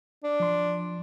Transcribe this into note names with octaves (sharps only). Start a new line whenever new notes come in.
D4
F3 C6